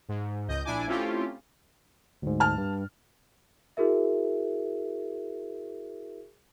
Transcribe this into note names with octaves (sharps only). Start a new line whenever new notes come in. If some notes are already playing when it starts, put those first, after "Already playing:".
G#2
C#2 D#5 G6
A#1 D4 E4 G#5 D6
A3 C4 C#4 E4 F4 G4
D2 G#2
A5 F6
G2
E4 F#4 G#4 A#4 E5